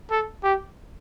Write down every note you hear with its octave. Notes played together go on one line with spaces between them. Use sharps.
A4
G4